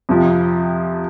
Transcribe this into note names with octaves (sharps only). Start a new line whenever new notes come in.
F2 C3 F3